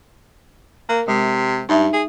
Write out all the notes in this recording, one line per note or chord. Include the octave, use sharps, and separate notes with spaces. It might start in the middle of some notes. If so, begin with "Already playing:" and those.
A#3 A#4
C3 G#3
G2 D#4 E5
G#4